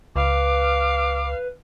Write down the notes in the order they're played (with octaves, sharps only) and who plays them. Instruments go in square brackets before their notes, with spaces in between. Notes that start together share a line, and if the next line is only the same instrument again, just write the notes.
[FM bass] C#2 [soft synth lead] B4 [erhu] F5 [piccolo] D6